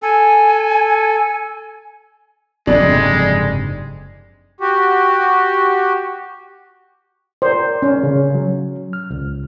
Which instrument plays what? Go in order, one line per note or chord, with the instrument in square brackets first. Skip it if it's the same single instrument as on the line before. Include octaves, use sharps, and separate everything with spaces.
[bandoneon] A4 [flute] G#5
[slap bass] F#1 G#2 C3 [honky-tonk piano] F2 D4 [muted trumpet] G#3
[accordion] F#4 G4
[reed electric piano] A#4 D5 [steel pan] C5
[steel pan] C#4
[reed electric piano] C#3
F#3
F6
C#2